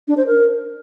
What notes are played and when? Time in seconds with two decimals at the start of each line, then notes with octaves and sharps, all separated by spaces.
0.08 D4
0.17 C5
0.27 A#4